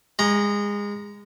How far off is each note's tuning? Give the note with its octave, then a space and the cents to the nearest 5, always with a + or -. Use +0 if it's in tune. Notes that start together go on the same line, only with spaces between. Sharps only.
G#3 -25 A#5 +10